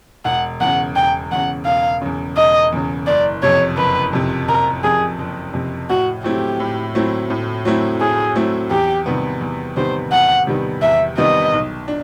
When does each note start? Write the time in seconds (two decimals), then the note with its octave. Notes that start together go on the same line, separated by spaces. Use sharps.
0.25 E1 F#5
0.60 E2 C#3 F#5
0.96 E1 G5
1.31 E2 C#3 F#5
1.66 E1 F5
2.02 E2 C#3
2.37 E1 D#5
2.72 E2 C#3
3.07 F#1 D5
3.43 F2 C3 C#5
3.77 F#1 B4
4.13 F2 C3
4.48 F#1 A#4
4.84 F2 C3 G#4
5.19 F#1
5.53 F2 C3
5.90 A2 F#4
6.24 F#3 A3 C4 E4 G4
6.60 A2
6.95 F#3 A3 C4 E4
7.30 A2
7.65 F#3 A3 C4 E4
8.00 A2 G#4
8.36 F#3 A3 C4 E4
8.71 E2 G4
9.06 C3 D#3 G3 B3
9.41 E2
9.77 C3 D#3 G3 B3 C5
10.12 E2 F#5
10.47 C3 D#3 G3 B3
10.82 E2 E5
11.18 C3 D#3 G3 B3 D#5
11.53 B1
11.88 D4